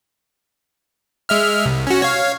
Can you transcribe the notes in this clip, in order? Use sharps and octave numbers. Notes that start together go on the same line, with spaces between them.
G#3 E5 F6
C2
C#4 F#4
C#5 F5